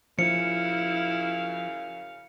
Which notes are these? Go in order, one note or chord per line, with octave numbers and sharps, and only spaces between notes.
F#2 C#3 F3 E4 F5 C#7